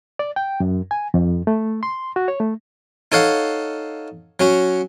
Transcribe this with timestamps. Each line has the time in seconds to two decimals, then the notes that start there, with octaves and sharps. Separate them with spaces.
0.19 D5
0.36 G5
0.60 F#2
0.91 G#5
1.14 F2
1.47 A3
1.83 C6
2.16 F#4
2.28 C#5
2.40 A3
3.12 D#4 A4 C#5 F5 F#5
4.40 F#3 C#4 F#4